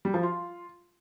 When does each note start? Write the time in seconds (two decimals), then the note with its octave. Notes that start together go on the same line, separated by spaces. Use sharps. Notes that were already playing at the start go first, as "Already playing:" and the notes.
0.05 G3
0.14 F3
0.23 F4